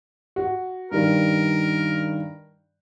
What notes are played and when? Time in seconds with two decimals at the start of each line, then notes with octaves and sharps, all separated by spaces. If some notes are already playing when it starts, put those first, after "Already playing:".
0.36 F#4
0.91 G2 D#3 A#4